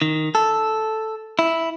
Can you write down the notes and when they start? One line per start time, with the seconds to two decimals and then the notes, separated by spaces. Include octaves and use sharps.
0.02 D#3
0.35 A4
1.39 E4